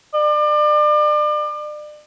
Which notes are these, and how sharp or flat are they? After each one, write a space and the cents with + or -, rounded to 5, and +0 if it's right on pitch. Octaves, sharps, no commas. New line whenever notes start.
D5 +35